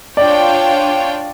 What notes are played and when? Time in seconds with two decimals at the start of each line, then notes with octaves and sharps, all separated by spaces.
0.17 D4 F4 C#5 D5 G5